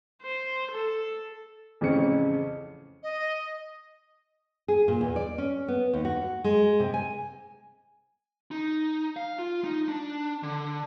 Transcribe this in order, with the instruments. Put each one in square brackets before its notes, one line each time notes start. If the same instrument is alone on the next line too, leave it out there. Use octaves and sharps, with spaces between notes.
[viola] C5
A4
[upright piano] A1 F2 C#3 C4 C#4 C#7
[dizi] D#5
[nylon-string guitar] G#4
A#2
E2
D5
C#4
B3
D#2
F#4
G#3
C3
G#5
[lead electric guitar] D#4
F5
F4
D#4
D4
D3